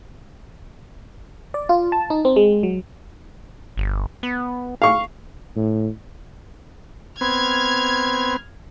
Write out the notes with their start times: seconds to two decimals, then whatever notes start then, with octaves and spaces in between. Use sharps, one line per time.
1.54 D5
1.69 F4
1.92 A5
2.10 D#4
2.25 C4
2.36 G#3
2.63 F#3
3.77 G1
4.23 B3
4.82 F5 C#6
5.56 A2
7.21 B3 C4 F6 G#6